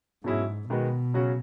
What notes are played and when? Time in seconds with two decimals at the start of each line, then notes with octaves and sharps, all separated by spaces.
0.24 G#2 B2 F#3 C#4 E4 G#4
0.69 B2 D#3 G#3 B3 F#4
1.14 C#3 F#3 C#4 F#4